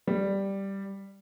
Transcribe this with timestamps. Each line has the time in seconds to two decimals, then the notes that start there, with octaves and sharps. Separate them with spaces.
0.07 G3